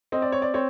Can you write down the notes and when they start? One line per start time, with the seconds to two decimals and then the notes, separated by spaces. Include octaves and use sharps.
0.12 C4 D#5
0.22 D5
0.32 C#5
0.42 D5
0.54 C4 C#5